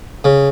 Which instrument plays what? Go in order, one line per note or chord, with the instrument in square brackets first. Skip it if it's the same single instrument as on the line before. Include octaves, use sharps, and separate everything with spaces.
[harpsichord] C#3